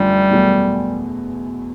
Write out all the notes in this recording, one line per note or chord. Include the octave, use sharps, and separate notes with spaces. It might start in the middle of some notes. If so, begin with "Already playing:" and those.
Already playing: F#2 D3 F3 G3 A3
E2 B2 F#3 A3